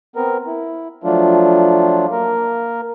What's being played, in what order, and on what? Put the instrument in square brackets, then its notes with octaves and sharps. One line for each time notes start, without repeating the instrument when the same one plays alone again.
[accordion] B3 C4 A#4
E4
F3 F#3 A3 D4 F4
A#3 A#4